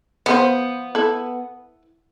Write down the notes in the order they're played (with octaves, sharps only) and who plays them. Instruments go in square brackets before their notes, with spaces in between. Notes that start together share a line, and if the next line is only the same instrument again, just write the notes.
[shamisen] F3 A4 C5 [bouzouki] B3
[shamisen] E4 A4